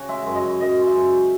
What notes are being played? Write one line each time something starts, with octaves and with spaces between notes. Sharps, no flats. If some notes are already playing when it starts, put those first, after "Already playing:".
Already playing: C#3 F#4
G#3 E5
F#2
D#5
F#2
F#2 D#5
G#3
E5
F#2